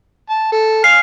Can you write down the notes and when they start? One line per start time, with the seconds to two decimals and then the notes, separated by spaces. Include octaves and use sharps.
0.29 A5
0.52 A4
0.84 F5 G#5 F6 C7